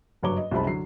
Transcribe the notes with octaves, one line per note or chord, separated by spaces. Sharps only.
F#1 G2 F#3 C#5 D6 G7
D#5
C2 F#2 G#3 C5 A5 B5
D3 F#3 C7